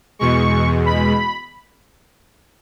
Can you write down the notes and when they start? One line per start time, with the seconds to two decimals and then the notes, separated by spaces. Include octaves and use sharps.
0.19 E2 B2 G#3 C#6
0.86 B5